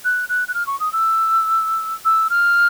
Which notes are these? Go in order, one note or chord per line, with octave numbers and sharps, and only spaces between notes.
F#6
F#6
F#6
F6
C#6
D#6
E6
E6
F6